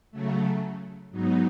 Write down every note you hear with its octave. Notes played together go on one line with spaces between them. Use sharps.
C#3 F#3 A3
G#2 F#3 B3 D#4